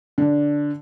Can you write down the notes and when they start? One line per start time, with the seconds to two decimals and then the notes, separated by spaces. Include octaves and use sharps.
0.18 D3 D4